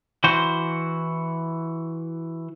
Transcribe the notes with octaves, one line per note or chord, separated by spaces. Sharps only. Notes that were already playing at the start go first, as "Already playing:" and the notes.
E3 F#4 C5